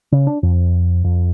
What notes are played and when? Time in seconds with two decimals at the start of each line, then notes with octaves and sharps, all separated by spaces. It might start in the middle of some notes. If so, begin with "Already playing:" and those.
0.12 C#3
0.27 D4
0.43 F2
1.04 F2